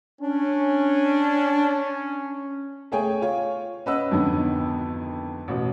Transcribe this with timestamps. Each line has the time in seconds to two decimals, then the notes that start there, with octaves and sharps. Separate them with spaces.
0.21 C#4 D4
2.92 A3 G#4 C#5 G5 G#5
3.22 F4 C#5
3.86 C#4 B4 D#5 F#5 E6
4.11 G#1 F2 D3 B3
5.48 A1 B2